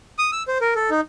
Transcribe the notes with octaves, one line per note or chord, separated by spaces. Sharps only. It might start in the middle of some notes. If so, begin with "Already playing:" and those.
D#6
E6
C5
A#4
A4
D#4